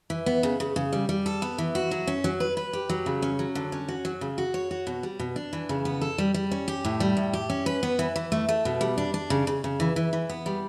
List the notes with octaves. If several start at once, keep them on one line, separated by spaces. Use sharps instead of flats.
E3
B3
C#3
C#3
C#3
G3
G3
A4
B3
E3
F#4
F#3
C#4
F#3
B4
B4
G4
F#3
C#3
C#4
F#3
D3
C#4
F#4
F#3
C#3
F#4
C#5
F#4
B2
G3
B2
D4
E3
C#3
B3
A4
G3
G3
C#4
G4
A2
G3
A2
G4
C#4
B4
B3
E3
E3
A3
A3
B2
G3
D4
D4
C#3
C#3
C#3
E3
E3
E3
B3
G3